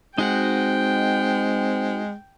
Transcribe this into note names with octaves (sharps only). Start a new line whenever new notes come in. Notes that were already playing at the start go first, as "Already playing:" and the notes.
G#3 C4 D#4 F#4 F#5 G5